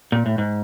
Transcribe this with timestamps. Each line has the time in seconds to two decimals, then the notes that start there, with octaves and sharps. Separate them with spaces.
0.12 A#2
0.26 A2
0.38 G#2